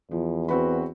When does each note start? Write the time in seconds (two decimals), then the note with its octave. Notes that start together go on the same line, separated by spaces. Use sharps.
0.11 E2 F3
0.49 C4 F#4 B4 B5